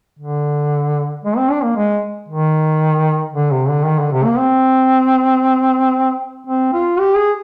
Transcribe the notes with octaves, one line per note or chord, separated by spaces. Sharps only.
D3
G#3
C4
D4
A#3
G#3
D#3
D3
C3
D3
D#3
D3
C3
A#3
C4
C4
F4
G4
G#4